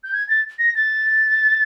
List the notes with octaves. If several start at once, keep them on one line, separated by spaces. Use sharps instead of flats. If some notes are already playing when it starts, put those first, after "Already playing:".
G6
G#6
A6
A#6
A6